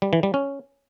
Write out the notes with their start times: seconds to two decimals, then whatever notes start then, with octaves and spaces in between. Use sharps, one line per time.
0.02 G3
0.13 E3
0.23 G3
0.34 C#4